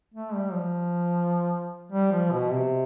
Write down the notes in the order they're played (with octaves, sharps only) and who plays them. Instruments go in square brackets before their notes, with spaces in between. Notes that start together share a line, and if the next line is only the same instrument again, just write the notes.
[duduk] A3
G3
F3
G3
F3
B2
C3